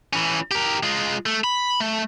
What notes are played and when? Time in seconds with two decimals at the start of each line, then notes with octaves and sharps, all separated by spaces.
0.13 E3 C#4
0.51 G4 A#4
0.83 G#3 F4
1.26 A3
1.44 B5
1.80 A3